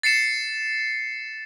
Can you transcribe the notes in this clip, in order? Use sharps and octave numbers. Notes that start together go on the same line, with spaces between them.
A6 C7 C#7 E7